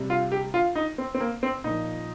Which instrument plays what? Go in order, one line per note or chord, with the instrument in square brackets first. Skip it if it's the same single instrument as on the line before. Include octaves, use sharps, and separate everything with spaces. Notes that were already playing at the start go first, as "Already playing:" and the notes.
Already playing: [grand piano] C3 G3
F4
G4
F4
D#4
C4
C4
A#3
C4
A#2 F3 D#4